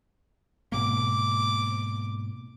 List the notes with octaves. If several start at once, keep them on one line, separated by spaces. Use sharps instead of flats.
G#2 B2 A#3 D6